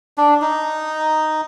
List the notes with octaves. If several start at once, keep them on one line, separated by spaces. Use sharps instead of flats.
D4
D#4